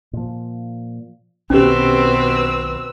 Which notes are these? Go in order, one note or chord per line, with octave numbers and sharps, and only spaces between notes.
A#2 F3
B1 B2 D#3 C4 C#4 G4 B4 E6